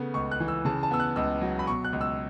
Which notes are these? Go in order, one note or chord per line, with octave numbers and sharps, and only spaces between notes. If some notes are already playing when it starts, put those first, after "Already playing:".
Already playing: C#3 A3 B3
C#2 C#6
F#6
E3
E6
C#3 A5
A5
B3 E6
F#6
C#2 E6
F#3
B5
B2 C#6
F#6
C#2
E6